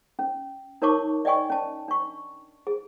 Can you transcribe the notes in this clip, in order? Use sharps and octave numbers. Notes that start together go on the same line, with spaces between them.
C#4
D#4 A#4 C#5 A5 C#6 D6
D5 D#5 G5 G#5 C#6
C#4 A5
D4 C#6
G#4